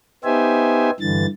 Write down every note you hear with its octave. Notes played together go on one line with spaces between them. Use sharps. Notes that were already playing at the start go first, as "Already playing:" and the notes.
B3 D#4 G4 C5 E5 G#5
G2 D3 E3 A6